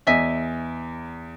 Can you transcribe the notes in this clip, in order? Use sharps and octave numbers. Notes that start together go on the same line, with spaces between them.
E2 D#5 E5 G#5